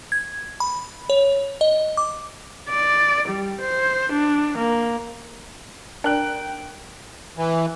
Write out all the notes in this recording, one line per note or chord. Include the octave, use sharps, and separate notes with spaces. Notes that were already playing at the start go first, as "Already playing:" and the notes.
G#6
B5
C#5
D#5
D6
D5
G3
C5
D4
A#3
D4 A#4 G5 F#6
E3